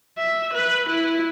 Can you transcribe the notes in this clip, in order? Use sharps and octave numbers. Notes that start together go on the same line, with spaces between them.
E5
B4
E4